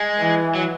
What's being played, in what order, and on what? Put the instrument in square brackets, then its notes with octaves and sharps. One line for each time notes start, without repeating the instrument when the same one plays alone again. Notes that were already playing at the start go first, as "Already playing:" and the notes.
Already playing: [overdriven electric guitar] G#3
[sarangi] E3
[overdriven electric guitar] F#3